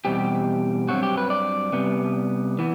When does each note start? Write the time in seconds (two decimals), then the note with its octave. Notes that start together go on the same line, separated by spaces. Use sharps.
0.05 E2 B2 G3 C4 G4
0.88 G2 F#3 C4 F#4
1.03 G4
1.17 B4
1.30 D5
1.72 C3 G3 B3
2.59 E3 B3